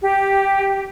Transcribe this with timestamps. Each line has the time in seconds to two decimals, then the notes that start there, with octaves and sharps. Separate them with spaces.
0.02 G4